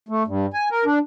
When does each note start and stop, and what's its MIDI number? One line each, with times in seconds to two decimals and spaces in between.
0.09 0.23 57
0.27 0.46 43
0.53 0.68 80
0.71 0.84 70
0.85 0.99 62